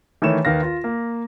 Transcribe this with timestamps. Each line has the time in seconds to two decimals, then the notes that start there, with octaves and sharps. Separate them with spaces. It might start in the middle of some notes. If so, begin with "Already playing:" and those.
0.22 D#3 E3 A3 C#5 E7
0.45 D#2 D#3 B4 F5 A#6
0.62 F4
0.84 A#3